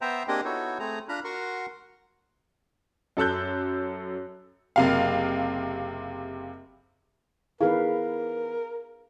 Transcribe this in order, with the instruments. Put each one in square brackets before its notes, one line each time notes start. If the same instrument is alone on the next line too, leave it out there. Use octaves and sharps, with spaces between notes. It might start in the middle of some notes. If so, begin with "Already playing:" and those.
[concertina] B3 C5 E5 G5 A#5
A#3 C4 D4 G4 G#4 D#5
B3 D#4 E4 F#4 A4 C#5
A3 C4 G#4 A#5
D4 F4 A#5 B5 F#6
F#4 A#4 F#5 C6 C#6
[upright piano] F#2 A4 A5 E6 F#6 G6
[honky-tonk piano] F#1 C3 F5
[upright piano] E3 B3 [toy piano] D#4 G#4 [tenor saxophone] A#4 [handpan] B4 F5